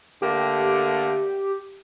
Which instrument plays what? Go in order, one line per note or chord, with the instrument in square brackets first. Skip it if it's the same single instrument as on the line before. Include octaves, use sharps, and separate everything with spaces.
[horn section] D3 A3 A#3 [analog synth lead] G4